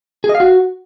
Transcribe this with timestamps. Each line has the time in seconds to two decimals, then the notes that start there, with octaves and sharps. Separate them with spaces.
0.24 G#4
0.29 D#5
0.35 F5
0.40 F#4